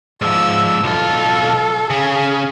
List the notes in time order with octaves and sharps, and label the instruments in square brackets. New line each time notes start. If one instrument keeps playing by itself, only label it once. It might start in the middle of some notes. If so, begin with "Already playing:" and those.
[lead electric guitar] G#2 F3 [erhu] E6
[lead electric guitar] B1 F4 [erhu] A4
[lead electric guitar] C#3 [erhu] G#4